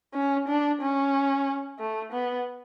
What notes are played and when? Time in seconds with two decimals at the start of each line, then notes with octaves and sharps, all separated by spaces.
0.14 C#4
0.48 D4
0.81 C#4
1.79 A3
2.12 B3